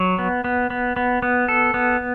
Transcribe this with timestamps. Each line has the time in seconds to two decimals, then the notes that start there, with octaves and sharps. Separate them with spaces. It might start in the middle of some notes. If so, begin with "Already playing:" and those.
Already playing: F#3
0.19 B3
0.44 B3
0.70 B3
0.96 B3
1.22 B3
1.48 A4
1.74 B3